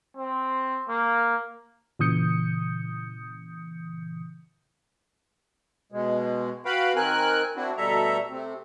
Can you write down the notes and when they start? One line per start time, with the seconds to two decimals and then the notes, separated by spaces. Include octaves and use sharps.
0.17 C4
0.89 A#3
1.99 A#2 C#3 E3 D#6 G6 C#7
5.92 B2 G#3
6.65 F#4 B4 F5 G5 B5
6.96 D#3 C4 A#4 G#5 F#6
7.56 C4 D4 E4 F#4
7.77 D2 B2 G3 A4 E5 A#5
8.30 C3 A3 C4